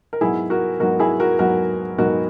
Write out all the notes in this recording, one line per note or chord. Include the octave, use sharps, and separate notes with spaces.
A#4
G#2 F#3 B3 E4 G#4
F#4 A#4
G#2 F#3 B3 F#4 A#4
E4 G#4
F#4 A#4
G#2 F#3 B3 F#4 A#4
G#2 F#3 B3 F#4 A#4